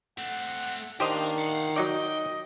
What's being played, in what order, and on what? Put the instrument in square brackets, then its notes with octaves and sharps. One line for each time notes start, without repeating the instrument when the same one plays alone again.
[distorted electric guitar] A3 C4 [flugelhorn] F#5
[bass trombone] D#3 [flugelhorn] D4 [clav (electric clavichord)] G4 C5 D#5 [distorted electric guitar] A#4 F5
[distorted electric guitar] F5 F#5
[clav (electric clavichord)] F#3 D#4 D5 [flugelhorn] D#5 [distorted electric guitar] G5